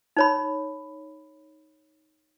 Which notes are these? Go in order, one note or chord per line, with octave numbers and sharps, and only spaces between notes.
D#4 C#5 B5